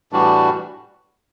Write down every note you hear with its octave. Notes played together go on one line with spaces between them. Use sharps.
A2 E3 G3 D4 F#4